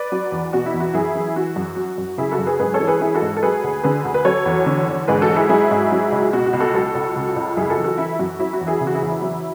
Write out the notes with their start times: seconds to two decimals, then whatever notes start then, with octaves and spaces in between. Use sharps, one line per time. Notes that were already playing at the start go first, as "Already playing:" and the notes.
Already playing: B4 D5
0.12 F#3
0.32 E2
0.53 B2 F#4
0.66 E4
0.74 E2
0.80 F#4
0.93 F#2 E4 G#4
1.15 E3
1.36 E3 F#4
1.56 F#2
1.77 F#3
1.98 F#2
2.18 C#3 E4 G#4
2.32 F#4 A4
2.39 F#2
2.46 G#4 B4
2.59 G#2 G#4 B4
2.74 A4 C#5
2.80 E3
2.87 G#4 B4
3.01 E3 E4 G#4
3.14 F#4 A4
3.22 G#2
3.37 A4
3.43 F#3 G#4 B4
3.64 D2
3.83 D3 G#4 B4
4.05 D2
4.14 B4
4.25 F#3 A4 C#5
4.46 E2
4.66 D3
4.88 E2
5.08 G#2 G#4 B4
5.22 F#4 A4
5.29 F#3
5.36 E4 G#4
5.49 F#3 E4 G#4
5.71 G#2
5.92 F#3
6.12 C#2
6.33 B2 F#4
6.46 F#4
6.53 C#2
6.60 F#4 A4
6.74 F#3 F#4 A4
6.95 C#2
7.16 C#3
7.36 C#2
7.57 F#2 E4 G#4
7.70 F#4 A4
7.77 E3
7.85 F#4 A4
7.98 E3 E4
8.19 F#2 F#4
8.39 F#3 E4
8.53 F#4
8.61 E2
8.67 E4 G#4
8.81 C#3
8.87 F#4
8.94 E4 G#4
9.02 E2
9.08 E4
9.22 F#3